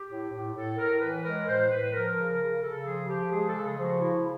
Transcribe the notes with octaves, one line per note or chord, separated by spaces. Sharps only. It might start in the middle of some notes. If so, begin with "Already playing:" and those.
Already playing: G4
A2
A2
A2 A4
A2 A#4
E3 B4
G#3 A#4
A2 C5
A2 B4
F3 A#4
C#3
A#4
C#3
C#3 A4
F3 G#4
F3 G4
G#3 G#4
A4
C#3
G#4
F3
F#4
C#3 E4